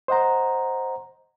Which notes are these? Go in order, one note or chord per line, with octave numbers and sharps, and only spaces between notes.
C5 D#5 F#5 A#5